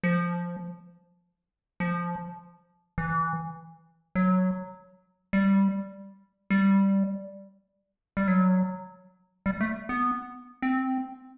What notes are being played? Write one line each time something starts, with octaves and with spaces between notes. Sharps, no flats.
F3
F3
E3
F#3
G3
G3
G3
F#3
G3
A3
B3
C4